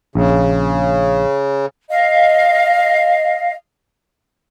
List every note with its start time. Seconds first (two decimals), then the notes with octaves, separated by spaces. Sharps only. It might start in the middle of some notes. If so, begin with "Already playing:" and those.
0.15 A#1 C#3
1.90 D#5 F5